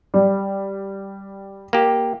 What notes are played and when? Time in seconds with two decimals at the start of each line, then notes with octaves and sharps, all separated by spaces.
0.14 G3
1.73 A#3 G4